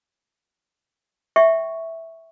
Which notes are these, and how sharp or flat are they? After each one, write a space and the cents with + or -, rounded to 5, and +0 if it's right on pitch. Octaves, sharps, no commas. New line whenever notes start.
E5 -5 G5 -20 C#6 +0